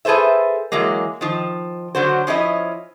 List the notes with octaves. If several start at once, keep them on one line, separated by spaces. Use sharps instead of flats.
G#4 A4 B4 C5 E5
E3 F#3 G#3 A#3
D#3 F3
D3 F#3 F#4 C5
F3 C#4 E4 D#5